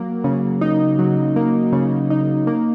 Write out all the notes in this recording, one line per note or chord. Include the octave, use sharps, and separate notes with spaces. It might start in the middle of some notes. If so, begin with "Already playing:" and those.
Already playing: F#3 A#3
C#3
D#4
F#3
A#3
C#3
D#4
A#3